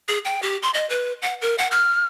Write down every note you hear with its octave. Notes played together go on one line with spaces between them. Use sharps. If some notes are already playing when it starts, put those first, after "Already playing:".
G#4
G5
G4
C6
D#5
B4
F#5
A#4
F#5
F6